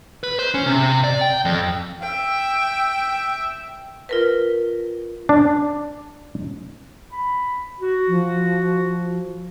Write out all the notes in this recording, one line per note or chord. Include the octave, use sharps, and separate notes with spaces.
B4
C5
C#4
C3
D5
G5
F2
E5 G5
F4 A#4 B4
D4
B5
F#4
F3